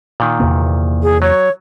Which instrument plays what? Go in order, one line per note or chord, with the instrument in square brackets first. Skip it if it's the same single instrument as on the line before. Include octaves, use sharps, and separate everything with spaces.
[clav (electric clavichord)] A#2 D#3
[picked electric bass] E2 C3 A#3
[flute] G#4
[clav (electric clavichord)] F#3 [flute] C#5